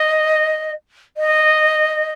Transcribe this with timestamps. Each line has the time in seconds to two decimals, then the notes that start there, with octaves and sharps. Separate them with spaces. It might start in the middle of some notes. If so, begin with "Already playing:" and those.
Already playing: D#5
1.17 D#5